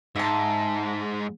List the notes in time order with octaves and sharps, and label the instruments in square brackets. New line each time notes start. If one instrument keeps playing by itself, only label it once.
[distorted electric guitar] G#2 [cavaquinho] E5 A5